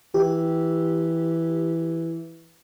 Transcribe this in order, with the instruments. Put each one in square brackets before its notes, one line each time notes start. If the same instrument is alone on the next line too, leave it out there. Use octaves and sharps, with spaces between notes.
[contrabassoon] E3 [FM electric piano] G4